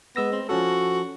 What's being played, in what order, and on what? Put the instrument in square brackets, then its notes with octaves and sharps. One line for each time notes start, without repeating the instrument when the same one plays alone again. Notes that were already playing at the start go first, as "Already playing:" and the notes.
[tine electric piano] G#3 E6 A#6 [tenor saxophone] B3
[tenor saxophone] C4
[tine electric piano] F3 C#4 A4 [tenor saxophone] F#4